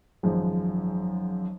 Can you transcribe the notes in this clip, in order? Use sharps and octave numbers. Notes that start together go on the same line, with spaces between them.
G#1 F#2 F3 G#3